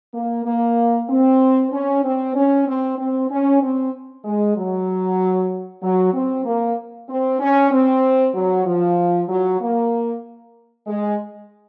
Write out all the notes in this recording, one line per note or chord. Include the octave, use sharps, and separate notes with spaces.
A#3
A#3
C4
C#4
C4
C#4
C4
C4
C#4
C4
G#3
F#3
F#3
C4
A#3
C4
C#4
C4
F#3
F3
F#3
A#3
G#3